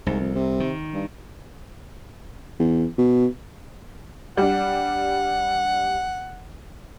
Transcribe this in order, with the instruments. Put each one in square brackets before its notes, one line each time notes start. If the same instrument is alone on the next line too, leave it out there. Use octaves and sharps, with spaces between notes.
[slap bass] C2 [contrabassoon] G#2
[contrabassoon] F2
C3
[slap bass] D#3
[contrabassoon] G2
E2
B2
[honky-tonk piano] G3 D4 [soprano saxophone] F#5